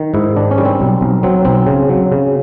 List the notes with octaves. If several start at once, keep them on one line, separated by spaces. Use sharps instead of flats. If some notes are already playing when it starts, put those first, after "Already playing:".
Already playing: D#3
G#2 E4
D#3 D4
C#4
G3
C4
B1
B1
F#3 C4
B1 C4
C#3
F#3
C#3